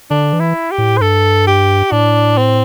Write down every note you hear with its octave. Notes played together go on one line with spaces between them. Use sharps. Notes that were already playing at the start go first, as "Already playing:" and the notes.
D3 D4
E3
E4
G4
A2
C5
G2 A4
G4
A2 D4
C4